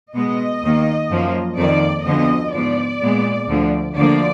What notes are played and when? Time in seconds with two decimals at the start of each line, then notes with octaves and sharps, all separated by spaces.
0.16 B2 G#3 B3 D#5
0.63 D#2 D#3 A#3
1.11 F#2 F3 A#3
1.59 F2 D#3 A#3 D5
2.06 D2 D3 F3 B3 D#5
2.54 G#2 F3 B3 D5
3.02 A#2 G#3 B3
3.49 D2 D3 F3
3.96 D2 D3 F3 A#3 D5